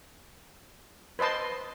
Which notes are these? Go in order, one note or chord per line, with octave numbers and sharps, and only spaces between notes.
B4 C5 D#5 A5 C6